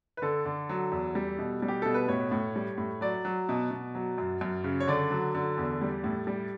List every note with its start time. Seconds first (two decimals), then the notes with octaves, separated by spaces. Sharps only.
0.17 B4
0.22 D3 A4
0.45 D3
0.69 F#3
0.92 E2
1.15 G3
1.38 B2
1.62 G3
1.68 G4
1.82 B2 A4
1.94 B4
2.08 A2 C#5
2.32 A2
2.56 G3
2.78 A2
3.01 F#3 D5
3.25 F#3
3.49 B2
3.71 B2
3.95 F#3
4.18 F#2
4.41 F#2
4.64 C#3
4.80 C#5
4.88 D3 D5
5.10 F#3
5.35 D3
5.57 E2
5.82 G3
6.04 A2
6.27 G3